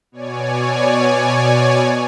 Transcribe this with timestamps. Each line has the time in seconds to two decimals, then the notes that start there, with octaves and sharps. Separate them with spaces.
0.12 B2 C#5 D5 G#5